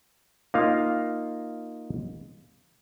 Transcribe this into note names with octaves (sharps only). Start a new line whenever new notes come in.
A#3 D#4 F4 F5